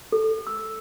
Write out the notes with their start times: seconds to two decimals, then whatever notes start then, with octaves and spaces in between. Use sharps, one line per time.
0.12 A4
0.47 E6